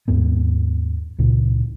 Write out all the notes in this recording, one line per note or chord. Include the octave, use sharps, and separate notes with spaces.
D#2 G#2 B3
C#2 A#2